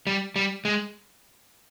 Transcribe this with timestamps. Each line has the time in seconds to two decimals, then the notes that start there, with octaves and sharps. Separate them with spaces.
0.07 G3
0.36 G3
0.65 G#3